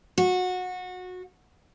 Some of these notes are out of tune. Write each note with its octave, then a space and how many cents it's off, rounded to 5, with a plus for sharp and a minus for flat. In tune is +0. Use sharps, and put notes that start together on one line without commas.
F#4 -20